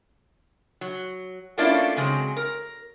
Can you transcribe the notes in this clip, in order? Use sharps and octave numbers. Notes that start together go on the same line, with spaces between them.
F#3
A3 A#3 C#4 D4 E4 F4
C#3 F#3 G#3 C4
A#4